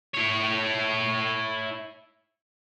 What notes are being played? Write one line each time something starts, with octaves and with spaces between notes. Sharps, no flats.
E4 C#5